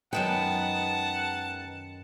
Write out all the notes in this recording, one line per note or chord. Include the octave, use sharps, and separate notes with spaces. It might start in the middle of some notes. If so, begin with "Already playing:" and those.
F#2 D#3 G#3 B3 F#5 G5 A5